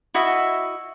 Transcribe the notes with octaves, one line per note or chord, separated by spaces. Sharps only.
E4 F#4 D#5 E5